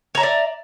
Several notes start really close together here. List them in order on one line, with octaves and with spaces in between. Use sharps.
C#5 A#5 E5 D5